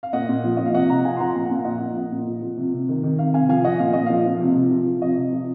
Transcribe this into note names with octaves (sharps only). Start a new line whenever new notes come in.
F5
A#2 D#5 F#5
A#2
F3
F3 D#5
F5
C3 D#5 F#5
C3 F#5 A#5
F3 F5 G#5
C6
F3 F#5 A#5
A#2 G#5
F#5
A#2 F5
F3 D#5 F#5
F3
A#2
A#2
F3
F3
C3
C3
D#3
D#3
C3 F5
C3 F5 G#5
F3 F5 G#5
F3 D#5 F#5
A#2 F5
A#2 D#5
F3 F5
F3
C3
C3
F3
F3
C3 D#5
C3
F3